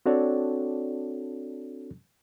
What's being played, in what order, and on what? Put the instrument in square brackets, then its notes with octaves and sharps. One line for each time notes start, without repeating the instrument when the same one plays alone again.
[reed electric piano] C4 D4 F#4 A4 C#5 D5